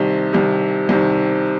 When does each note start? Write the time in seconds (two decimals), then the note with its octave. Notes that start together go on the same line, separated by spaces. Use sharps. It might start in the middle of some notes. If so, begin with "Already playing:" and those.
Already playing: C2 C3 D#3
0.33 C2 C3 D#3
0.89 C2 C3 D#3